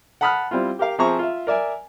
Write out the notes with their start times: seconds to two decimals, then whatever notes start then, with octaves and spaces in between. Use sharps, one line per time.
0.21 F#5 A5 B5 D#6 F6 F#6
0.51 G3 C4 E4 F4
0.79 G4 A#4 F5
0.99 F3 C4 G#4 E5 A#5 C#6
1.19 F4 E5
1.47 A#4 D5 E5 G#5